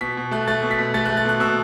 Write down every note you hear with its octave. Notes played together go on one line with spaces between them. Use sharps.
B2 B6
B2
A3 F#6
A3 A6
B2
B6
B2
A3 A6
A3 F#6
A6
B2 F#6
B2 E6